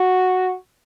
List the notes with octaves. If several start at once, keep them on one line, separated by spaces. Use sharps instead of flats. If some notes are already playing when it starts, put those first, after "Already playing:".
Already playing: F#4